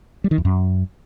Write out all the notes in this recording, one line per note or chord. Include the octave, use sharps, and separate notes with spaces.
G3
D#3
E2
F#2